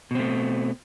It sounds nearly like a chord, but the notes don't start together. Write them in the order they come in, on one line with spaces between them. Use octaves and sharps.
B2 C4 A3